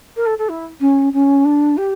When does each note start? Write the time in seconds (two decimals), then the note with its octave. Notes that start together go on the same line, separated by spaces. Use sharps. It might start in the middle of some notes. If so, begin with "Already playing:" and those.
0.16 A#4
0.26 A4
0.38 A4
0.49 E4
0.80 C#4
1.13 C#4
1.45 D4
1.77 G4